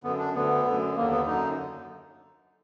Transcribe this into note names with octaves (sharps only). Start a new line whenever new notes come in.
F#2 D3 B3
D4
D2 D3 B3
F#2 D3
D#2 D3 A#3
B3
F#2 D3 D#4